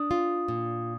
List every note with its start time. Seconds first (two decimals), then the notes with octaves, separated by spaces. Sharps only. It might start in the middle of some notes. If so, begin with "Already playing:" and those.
Already playing: D4 D#6
0.11 F4
0.48 A#2